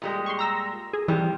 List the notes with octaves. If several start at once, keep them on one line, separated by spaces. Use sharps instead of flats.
A#2 G3 G#3
C6 C#6
A#5 E6 A#6
G#4
G#2 C3 E3 G3